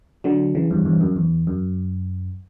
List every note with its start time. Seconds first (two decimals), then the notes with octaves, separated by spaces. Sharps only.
0.24 D3 F#3
0.55 C#3 E3
0.71 E2 G2
0.85 E2 G2
1.01 F#2
1.16 E2
1.47 F#2